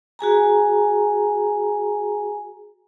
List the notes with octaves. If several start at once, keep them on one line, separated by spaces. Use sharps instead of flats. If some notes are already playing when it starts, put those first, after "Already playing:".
F#4 G#4 G#5 A#5